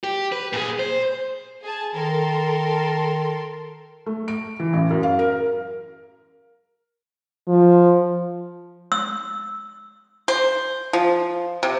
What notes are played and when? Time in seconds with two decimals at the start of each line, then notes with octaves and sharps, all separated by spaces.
0.04 G4
0.32 B4
0.53 A#2 G#4
0.79 C5
1.63 G#4 A5
1.95 D#3 A4 A#4 C6
4.06 A3
4.28 D7
4.60 E3
4.73 A1
4.91 F#2
5.03 F5
5.19 A#4
7.48 F3
8.92 E6
10.28 C5
10.93 F3
11.63 C3